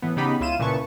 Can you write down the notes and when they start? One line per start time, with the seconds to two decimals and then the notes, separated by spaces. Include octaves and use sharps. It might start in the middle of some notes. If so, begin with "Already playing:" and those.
0.02 A2 E3 B3
0.17 C#3 B3 D#4 G4 B5
0.40 C#2 E4 F4 D#7 E7
0.59 A#2 C#3 E4 B4 A5 C#6